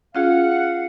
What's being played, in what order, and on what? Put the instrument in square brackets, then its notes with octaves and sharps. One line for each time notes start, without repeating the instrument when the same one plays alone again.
[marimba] C#4 F4 G#4 [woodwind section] F5 F#5